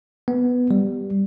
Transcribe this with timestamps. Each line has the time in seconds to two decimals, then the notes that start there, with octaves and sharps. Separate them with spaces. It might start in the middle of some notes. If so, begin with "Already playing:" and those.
0.28 B3
0.71 G3